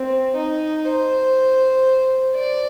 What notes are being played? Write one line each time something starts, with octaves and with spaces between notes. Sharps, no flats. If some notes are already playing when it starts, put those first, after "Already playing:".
Already playing: C4
D#4
C5
D5